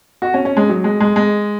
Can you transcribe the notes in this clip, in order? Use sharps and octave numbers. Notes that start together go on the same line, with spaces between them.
F#4
C#4
C#4
G#3
F#3
G#3
G#3
G#3